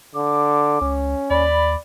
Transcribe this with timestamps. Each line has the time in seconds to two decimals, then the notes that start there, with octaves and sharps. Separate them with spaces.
0.15 D3 D6
0.81 C#2 C#4
1.30 D#2 D5 B5